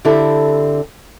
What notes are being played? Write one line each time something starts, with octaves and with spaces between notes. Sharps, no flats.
D3 C4 E4 G4 A4